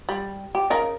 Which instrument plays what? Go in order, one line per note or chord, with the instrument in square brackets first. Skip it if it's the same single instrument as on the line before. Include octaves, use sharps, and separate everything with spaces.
[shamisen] G3
G4
C#3 A#4 D#5